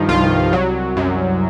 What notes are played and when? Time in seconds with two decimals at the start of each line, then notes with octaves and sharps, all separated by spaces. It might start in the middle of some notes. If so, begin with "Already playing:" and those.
Already playing: G2 D#3 F3
0.09 C2 F4
0.53 F#3
0.97 F#2